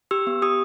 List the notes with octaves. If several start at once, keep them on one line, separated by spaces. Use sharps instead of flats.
G4 E6
B3
G4 D#6